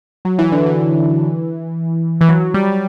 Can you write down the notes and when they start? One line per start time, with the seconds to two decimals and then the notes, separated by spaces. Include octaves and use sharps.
0.25 F#3
0.39 E3
0.52 D3
0.66 E3
2.21 E3
2.29 F#3
2.54 G3